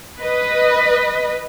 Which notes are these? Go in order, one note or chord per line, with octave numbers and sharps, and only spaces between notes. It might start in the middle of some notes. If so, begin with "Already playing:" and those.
B4 D#5